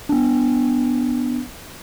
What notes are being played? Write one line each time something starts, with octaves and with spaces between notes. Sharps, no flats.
B3 D4